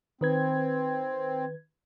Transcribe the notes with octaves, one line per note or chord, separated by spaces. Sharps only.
D#3 C4 B4 G#6